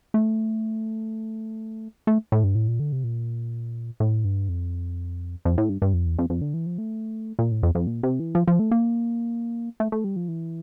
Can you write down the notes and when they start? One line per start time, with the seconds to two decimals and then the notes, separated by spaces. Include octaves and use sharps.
0.14 A3
2.07 A3
2.32 A2
2.44 G2
2.55 A2
2.68 A#2
2.80 D3
2.92 C3
3.04 A#2
4.00 A2
4.25 G2
4.49 F2
5.45 F2
5.58 A2
5.69 G2
5.82 G2
5.94 F2
6.06 E2
6.19 F2
6.30 F2
6.42 D3
6.54 E3
6.66 F3
6.78 A3
7.39 A#2
7.51 A2
7.63 F2
7.75 F2
7.87 A#2
8.03 C3
8.20 E3
8.35 F3
8.47 F3
8.59 A3
8.71 A#3
9.80 A3
9.92 A3
10.04 G3
10.16 F3
10.28 E3